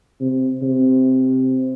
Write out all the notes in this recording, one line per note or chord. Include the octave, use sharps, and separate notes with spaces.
C3
C3